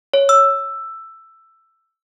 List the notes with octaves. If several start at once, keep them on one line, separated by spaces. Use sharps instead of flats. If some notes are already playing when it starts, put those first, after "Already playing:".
C#5
E6